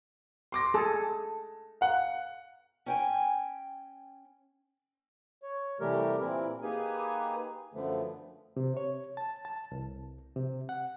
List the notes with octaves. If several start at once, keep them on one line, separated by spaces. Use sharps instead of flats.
C6 D6 A#6
G#4 A4 A5
F5 F#5
C#4 G5 G#5
C#5
C3 E3 G3 A3 G4 A#4
A#2 E3 C4 E4 A#4
A#3 D#4 G4 G#4 B4 G#5
F#2 D3 F3 A3 B3
C3
C#5
A5
A5
C2
C3
F#5